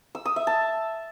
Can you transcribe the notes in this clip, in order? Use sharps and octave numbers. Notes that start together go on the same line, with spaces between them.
E6
D#6
E5
A5